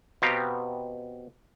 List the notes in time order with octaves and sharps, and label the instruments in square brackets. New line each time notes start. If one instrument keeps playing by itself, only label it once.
[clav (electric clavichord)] B2 B3 C4 G4 F5 A#5